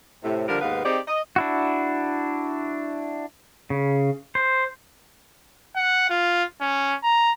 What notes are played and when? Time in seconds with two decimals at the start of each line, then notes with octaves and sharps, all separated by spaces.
0.23 A2 C3
0.49 D3 F3 G3 A#4
0.61 D#2 G#2 B3 B4 F5
0.84 C4 D#4 G4 G#4 C5 D5
1.07 D#5
1.36 D4 E4 F#4
3.70 C#3
4.35 C5
5.76 F#5
6.10 F4
6.61 C#4
7.03 A#5